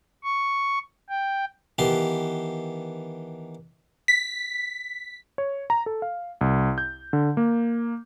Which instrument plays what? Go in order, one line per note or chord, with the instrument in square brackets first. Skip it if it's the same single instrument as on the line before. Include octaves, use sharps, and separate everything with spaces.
[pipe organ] C#6
G5
[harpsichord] D#3 E3 B3 G4 A5 C6
[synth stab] B6
[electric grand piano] C#5
A#5
A4
F5
C2
G6
D3
A#3